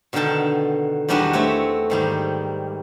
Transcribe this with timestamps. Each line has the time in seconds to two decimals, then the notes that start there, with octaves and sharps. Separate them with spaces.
0.13 B2 D3 D#3 A#4 G5 A5
1.08 E2 D#3 G3 D4 F#4 B4
1.33 A3 C4 C#5 E5
1.90 G#2 D#3 G3